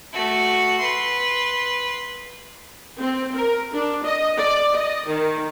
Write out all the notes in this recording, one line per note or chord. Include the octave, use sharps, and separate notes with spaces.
A3 F#4
B4 C6
C4
A#4
D4
D#5
D5
D#5
D#3